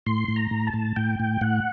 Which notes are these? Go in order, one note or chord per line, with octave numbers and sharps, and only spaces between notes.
A2 C6
A2
A#5
A2
A5
A2
A2 G5
A2
A2 F#5